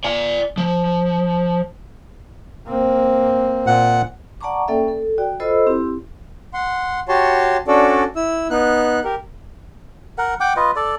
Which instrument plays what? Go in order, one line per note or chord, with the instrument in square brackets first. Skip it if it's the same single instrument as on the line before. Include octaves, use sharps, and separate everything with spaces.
[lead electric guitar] D5 G#5
F3
[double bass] A#3 C4
[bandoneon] A#2 F#5
[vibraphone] D5 F#5 A5 A#5 C#6 D6
A#3 C#4 A4 D5 E5 G5
A4
F#4 D5 G5
F4 A4 C5 D#5 B5 E6
C4 E4 G4
[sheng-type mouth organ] F#5 C6
F#4 G4 C#5 A5 C6
C#4 D4 F#4 A4 D5
E4 E6
B3 D#4 F#6
G4 A#4
[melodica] A#4 F#5
F#5 G5 D6
F4 B4 D#5
A4 D5